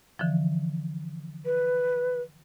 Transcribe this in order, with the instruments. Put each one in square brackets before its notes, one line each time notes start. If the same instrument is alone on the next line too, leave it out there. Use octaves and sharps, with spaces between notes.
[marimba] D3 E3 F3
[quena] B4